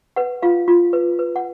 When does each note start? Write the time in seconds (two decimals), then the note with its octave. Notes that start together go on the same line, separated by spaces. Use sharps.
0.16 B4 F#5
0.42 F4 F5
0.68 F4
0.93 B4
1.19 B4
1.36 F#5